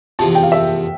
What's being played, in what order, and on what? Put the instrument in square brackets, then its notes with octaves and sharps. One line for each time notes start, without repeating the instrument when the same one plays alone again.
[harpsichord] E2 C3 F3 [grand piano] A5
[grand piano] G5
F5
E5